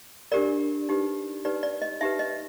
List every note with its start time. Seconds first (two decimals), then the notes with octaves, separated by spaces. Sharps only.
0.32 D4 G4 A#4 D5
0.89 D#4 G4 B4
1.45 D#4 G4 B4 D5
1.63 D5
1.82 D#5
2.01 D#4 G4 B4 E5
2.19 D#5